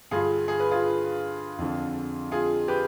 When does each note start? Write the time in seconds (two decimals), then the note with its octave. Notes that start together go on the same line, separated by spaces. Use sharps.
0.11 G2 D3 F4 G#4
0.48 G#4
0.60 B4
0.71 F4 G#4
1.59 F2 D3
2.32 F4 G#4
2.68 G4 B4